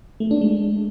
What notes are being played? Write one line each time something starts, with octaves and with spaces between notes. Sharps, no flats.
A3
D4
G#3